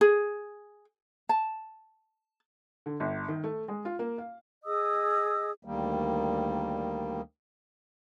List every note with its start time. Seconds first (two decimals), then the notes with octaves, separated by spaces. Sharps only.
0.01 G#4
1.29 A5
2.86 D3
3.00 G1
3.28 D#3
3.44 A3
3.68 G#3
3.85 F4
3.99 A#3
4.18 F5
4.64 G#4 D#5 D#6 E6
5.65 D2 D#3 G3 A#3